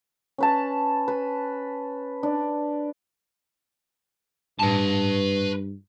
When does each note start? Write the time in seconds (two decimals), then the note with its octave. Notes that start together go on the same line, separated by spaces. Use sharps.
0.38 C#4 B4 A5
1.08 B4
2.23 D4
4.60 G2 B4 A5